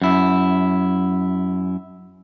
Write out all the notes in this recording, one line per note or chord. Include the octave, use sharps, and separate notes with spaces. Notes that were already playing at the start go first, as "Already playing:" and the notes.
F#2 E4